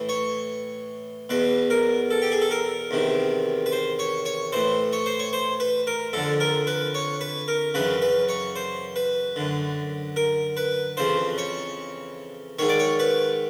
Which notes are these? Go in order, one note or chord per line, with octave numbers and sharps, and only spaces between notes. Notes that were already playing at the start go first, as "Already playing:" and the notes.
Already playing: A2 E3
C#5
E2 B2 B4
A#4
A4
G4
G#4
A4
A#4
E2 C3 D#3
B4
C5
C#5
C#5
A2 E3 C5
C#5
C5
C#5
C5
B4
A#4
F2 D3 A4
A#4
B4
C#5
B4
A#4
F#2 C#3 E3 B4
B4
C#5
C5
B4
F#2 D3
A#4
B4
F2 C#3 E3 C5
C#5
G#2 D#3 C#5
D5
C#5
B4